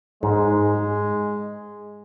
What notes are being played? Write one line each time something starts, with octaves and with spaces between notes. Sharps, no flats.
G#2 G#3